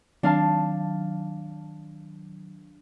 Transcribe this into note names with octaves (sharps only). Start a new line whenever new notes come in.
D#3 F#3 D4 F5 A5